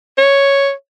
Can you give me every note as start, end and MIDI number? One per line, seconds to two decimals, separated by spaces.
0.18 0.71 73